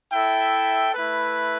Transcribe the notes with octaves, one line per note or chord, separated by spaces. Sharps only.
E4 A4 E5 G5
A3 E4 B4